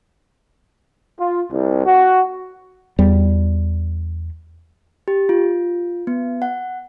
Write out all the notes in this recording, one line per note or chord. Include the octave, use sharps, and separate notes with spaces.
F4
C2
F#4
E2 G3
G4
F4
B3
F#5